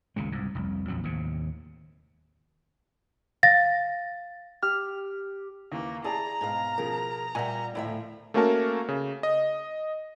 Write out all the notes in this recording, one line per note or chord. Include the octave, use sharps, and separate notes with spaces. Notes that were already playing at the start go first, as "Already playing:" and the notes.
D#1 C#2 A#2 G#3
C2 G#2
F1 C2
A#1 F2 F#3
D#2 A2 C3
F5 A6 A#6
G4 F6
D#2 E3 A#3
E4 G#4 D5 A5 A#5
G#2 B2 F5
B2 F3 G#4 A#4
A#2 G3 E5 F#5 G#5
D2 A2 F3 E4 E5
A3 A#3 C#4 F#4 A#4 A5
C#3
D#5